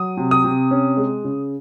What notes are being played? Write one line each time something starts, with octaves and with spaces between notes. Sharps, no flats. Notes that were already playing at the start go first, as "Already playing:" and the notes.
Already playing: F#3 D#6
C3
D#6
C3
C#4
G#3
C#3